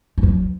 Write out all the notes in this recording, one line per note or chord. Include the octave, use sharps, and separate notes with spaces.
F2
F#2
D3